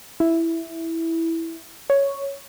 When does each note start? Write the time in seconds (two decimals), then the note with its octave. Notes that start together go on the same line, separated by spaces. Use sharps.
0.20 E4
1.90 C#5